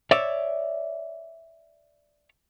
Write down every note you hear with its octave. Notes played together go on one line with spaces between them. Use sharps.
C#5 D5 E5